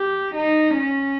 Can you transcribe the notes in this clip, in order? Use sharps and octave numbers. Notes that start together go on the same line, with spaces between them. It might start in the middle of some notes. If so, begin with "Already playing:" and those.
Already playing: G4
D#4
C#4